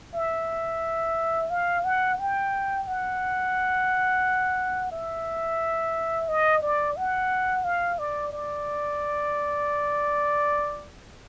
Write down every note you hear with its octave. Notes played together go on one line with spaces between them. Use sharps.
E5
F5
F#5
G5
F#5
E5
D#5
D5
F#5
F5
D5
D5